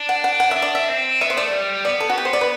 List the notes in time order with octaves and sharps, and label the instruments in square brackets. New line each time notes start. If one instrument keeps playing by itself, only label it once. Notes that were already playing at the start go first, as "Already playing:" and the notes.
Already playing: [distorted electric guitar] D4
[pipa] F#5
F#5
F#5
E5
[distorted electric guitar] D4
[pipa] D5
E5
[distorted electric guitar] C4
[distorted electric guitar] B3 [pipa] E5
[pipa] C5
[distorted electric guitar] A3 [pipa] D5
[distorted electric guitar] G3
[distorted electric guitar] B3 [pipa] D5
[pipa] A4
F#4
G4
C5
D5
B4